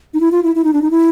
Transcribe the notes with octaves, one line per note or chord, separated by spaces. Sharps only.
D#4
E4
F4
E4
E4
D#4
D4
D#4
E4